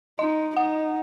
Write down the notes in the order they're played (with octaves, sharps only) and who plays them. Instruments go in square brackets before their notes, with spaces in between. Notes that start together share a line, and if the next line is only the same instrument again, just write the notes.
[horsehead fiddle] D#4 [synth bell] D#5
[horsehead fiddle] D#4 [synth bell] F#5